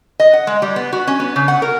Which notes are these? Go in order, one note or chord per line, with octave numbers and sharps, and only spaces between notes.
D#5
F#5
G#3
G3
B3
F#4
C#4
B3
C#3
F#5
A#4